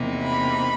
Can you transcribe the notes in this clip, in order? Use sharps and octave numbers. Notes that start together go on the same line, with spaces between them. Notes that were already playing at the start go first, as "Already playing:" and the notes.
Already playing: E2 C3 F3 A#3 D#4
B5